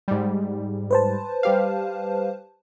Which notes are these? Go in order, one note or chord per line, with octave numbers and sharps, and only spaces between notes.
G#2 G3
B4 C5 A5
G3 G4 F5